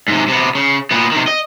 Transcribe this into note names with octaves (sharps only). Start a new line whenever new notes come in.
G#2 C3
C3 B3
C#3
A#2 B3
C3 D#3
D#5